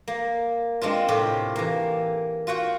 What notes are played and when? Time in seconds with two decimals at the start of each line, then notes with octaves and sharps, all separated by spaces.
0.08 A#3
0.81 G#3 C4 D4 F4
1.08 A2 C3 F4 G4
1.56 E3 A#3
2.47 F4 F#4 F#5 G5